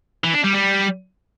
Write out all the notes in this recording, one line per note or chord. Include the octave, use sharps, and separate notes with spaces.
E3
D4
G3
G3